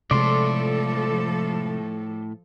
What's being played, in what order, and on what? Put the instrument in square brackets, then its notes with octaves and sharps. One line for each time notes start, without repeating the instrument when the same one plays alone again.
[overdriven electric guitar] A2 A3 [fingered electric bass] C3 G#3 [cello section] F3 A4 [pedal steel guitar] D5 C6